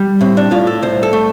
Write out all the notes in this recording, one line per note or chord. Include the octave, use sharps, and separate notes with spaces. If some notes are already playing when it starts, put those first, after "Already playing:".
Already playing: G3
A2 C4
D4
A2 F4
A4
C2 C5
A4
A3